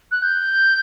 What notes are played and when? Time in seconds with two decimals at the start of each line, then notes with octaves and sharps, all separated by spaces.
0.12 F#6
0.22 G6